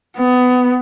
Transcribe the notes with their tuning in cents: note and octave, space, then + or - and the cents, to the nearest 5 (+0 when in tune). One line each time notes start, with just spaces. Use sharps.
B3 +20